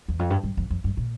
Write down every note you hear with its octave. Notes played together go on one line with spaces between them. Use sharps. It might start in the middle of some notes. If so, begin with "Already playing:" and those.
E2
F2
G2
G2
F2
F2
G2
A#2